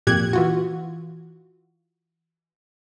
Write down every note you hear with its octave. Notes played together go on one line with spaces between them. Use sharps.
F2 A#2 G4 F#6 G#6
E3 F4 F#4